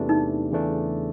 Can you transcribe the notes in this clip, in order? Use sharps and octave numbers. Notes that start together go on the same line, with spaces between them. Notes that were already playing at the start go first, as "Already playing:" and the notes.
Already playing: E2 C3 E3 A3 D4
D#4
E2 C#3 E3 A3 D4